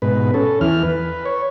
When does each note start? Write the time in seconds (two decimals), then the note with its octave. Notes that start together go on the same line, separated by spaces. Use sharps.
0.02 G#2 B2 B4
0.34 C#4 A4
0.61 E2 E3 F6
0.83 B4
1.25 C#5